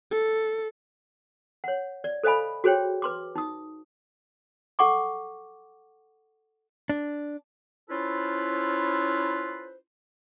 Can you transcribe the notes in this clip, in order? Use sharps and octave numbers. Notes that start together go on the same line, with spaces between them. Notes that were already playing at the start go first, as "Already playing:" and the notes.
A4
C#5 F#5
D5
A4 C5 D#5 F5 G#5 B5
F#4 G#4 C5 C#5 G5
B4 C6 D6
D#4 D#6
A4 F#5 C#6 D6
D4
C#4 E4 F4 A4 B4 C5